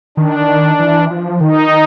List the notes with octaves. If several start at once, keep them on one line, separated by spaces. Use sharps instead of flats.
D#3 D4
E3
F3
D#3 D#4